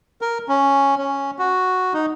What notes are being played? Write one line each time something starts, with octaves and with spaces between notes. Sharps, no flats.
A#4
C#4
C#4
F#4
D#4